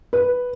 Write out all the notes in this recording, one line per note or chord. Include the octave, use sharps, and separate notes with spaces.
B4